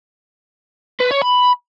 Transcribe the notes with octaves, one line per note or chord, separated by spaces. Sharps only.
B4
C#5
B5